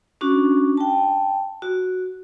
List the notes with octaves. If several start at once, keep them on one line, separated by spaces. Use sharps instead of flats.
C#4 D4 F#4
G5 A5
F#4